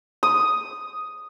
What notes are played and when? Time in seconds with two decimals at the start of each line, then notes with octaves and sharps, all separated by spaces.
0.23 D#6